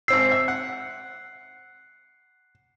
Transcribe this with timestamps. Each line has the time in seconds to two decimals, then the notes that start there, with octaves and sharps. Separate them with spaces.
0.08 G#1 C4 E6 C7
0.32 E5
0.48 F#5